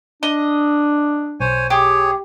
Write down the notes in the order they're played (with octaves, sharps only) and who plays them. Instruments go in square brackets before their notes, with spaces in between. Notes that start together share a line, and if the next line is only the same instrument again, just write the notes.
[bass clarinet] D4 [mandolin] D#5
[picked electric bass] B1 [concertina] C5 C#5 G#5
[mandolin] G4 [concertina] G#4 C#5